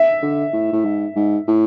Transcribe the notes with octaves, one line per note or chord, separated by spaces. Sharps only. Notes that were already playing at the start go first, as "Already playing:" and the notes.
Already playing: E5
D3
A2
A2
G#2
G#2
A2